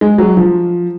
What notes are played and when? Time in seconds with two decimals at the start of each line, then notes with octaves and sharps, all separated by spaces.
0.01 G#3
0.18 F#3
0.37 F3